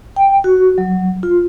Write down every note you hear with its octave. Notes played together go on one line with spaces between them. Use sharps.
G5
F#4
F#3
F4